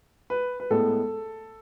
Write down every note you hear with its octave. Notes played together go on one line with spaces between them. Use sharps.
B4
B4
A2 G#3 B3 A4